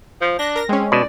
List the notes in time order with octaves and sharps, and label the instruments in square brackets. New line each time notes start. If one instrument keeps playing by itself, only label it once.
[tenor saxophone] F3
[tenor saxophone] D4 [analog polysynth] F#6 A#6
[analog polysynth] A#4 A#6
[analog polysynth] G#3 C#4 [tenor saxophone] C4
[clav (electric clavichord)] B2 [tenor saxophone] D5